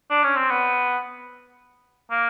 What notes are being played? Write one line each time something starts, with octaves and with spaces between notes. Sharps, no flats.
D4
C#4
C4
B3
A#3